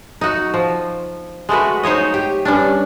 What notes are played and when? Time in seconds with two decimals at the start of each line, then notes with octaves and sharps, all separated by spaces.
0.21 D#4 F#4
0.54 F3
1.49 G#3 A3 F#4 B4
1.83 D#4 C5 C#5 D#5
2.14 G4
2.45 G2 C#4 D4